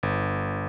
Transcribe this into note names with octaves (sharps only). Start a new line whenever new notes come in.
G1